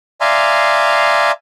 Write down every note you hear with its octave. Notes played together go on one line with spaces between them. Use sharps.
D5 E5 F5 G#5 A#5 C6